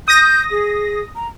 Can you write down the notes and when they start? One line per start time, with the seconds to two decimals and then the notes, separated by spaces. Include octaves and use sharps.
0.08 D#6 G6 A#6
0.51 G#4
1.16 A#5